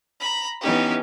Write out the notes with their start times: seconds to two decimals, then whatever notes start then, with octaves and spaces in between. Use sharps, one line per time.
0.20 A#5 B5
0.61 E3 B3 C#4 D#4 G4